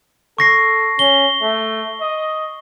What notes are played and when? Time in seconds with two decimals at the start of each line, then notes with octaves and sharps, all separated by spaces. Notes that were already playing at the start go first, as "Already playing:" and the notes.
0.38 A4 C#6 A#6 C7
0.99 C#4 G7
1.42 A3
2.01 D#5